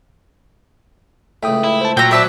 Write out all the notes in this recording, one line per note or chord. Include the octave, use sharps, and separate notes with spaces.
C#2 A2 E5 G5 D#6
E4
C5 A5
A#2 F#3 G5 A#5 E6
C4 B4 D5 E5 A5